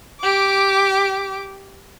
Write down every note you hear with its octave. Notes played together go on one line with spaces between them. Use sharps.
G4 D6